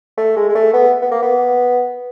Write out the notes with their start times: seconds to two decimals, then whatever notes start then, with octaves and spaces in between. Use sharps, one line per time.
0.17 A3
0.37 G#3
0.49 G#3
0.55 A3
0.73 B3
1.02 B3
1.11 A#3
1.22 B3